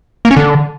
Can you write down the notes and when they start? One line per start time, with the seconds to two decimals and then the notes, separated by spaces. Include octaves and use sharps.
0.25 A#3
0.31 C#4
0.37 D3